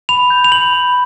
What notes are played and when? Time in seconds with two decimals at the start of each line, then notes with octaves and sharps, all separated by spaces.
0.09 B5 F7
0.30 G6
0.44 F7
0.52 B5 F#7
0.73 B5